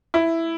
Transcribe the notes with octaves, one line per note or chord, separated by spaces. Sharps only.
E4